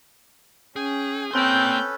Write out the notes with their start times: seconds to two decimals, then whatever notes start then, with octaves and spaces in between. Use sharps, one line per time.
0.76 C#4 G#4 G5 G#5
1.33 A#3 C4 C#4 A4 B4 C6 G6